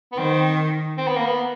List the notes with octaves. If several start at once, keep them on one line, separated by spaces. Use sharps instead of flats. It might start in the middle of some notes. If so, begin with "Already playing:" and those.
B3
D#3 C4
C4
B3
A#3
B3